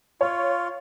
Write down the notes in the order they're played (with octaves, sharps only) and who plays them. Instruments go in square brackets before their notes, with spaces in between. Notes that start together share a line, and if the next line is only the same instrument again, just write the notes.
[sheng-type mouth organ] F4 [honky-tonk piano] C#5